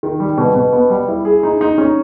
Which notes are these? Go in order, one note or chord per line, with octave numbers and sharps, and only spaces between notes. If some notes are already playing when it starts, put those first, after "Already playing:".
D#3
G3
B2
B2
B3
G3
E4
G#4
D#4
D#4
C#4